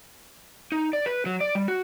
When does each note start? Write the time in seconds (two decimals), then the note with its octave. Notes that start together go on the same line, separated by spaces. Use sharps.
0.72 D#4
0.93 D5
1.06 B4
1.26 F#3
1.40 D5
1.55 G3
1.68 F#4